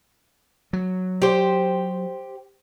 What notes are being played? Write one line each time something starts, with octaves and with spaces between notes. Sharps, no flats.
F#3
G4 C5